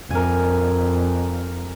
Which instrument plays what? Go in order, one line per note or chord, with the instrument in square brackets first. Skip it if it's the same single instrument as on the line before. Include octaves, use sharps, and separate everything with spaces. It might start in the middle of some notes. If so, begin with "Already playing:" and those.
[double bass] F2 [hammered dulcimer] A#4 G#5